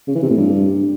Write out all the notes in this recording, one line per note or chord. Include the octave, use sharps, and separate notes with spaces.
C#3
E3
C3
A2
G2